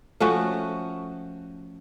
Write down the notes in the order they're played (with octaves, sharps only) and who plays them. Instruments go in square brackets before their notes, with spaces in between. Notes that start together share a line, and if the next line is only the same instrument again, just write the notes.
[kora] F3 A3 C#4 F#4